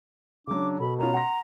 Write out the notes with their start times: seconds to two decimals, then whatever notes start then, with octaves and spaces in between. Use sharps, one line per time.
0.47 C#3 F#3 D4 D6
0.80 B2 A4 B5
0.99 B3 C#4 F4 A#5
1.14 F#5 C6 A#6